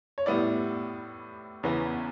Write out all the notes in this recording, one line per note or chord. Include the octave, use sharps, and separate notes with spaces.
C#5
A2 G3 B3 E4 D5
E2 C#3 E3 B3